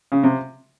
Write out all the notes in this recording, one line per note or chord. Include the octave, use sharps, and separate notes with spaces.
C#3
C3